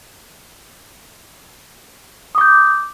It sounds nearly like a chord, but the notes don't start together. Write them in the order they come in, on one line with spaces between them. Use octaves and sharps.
D#6 D6 G6